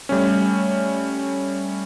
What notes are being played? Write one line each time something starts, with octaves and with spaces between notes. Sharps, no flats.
G3 A3 C#4